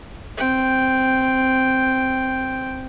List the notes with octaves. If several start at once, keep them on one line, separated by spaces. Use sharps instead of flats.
C4 G5